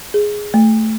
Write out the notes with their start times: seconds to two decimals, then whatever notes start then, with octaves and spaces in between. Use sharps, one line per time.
0.14 G#4
0.54 A3